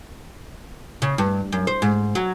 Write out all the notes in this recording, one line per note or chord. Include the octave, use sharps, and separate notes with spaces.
C#3
G2
F#2
C5
G#2
F#3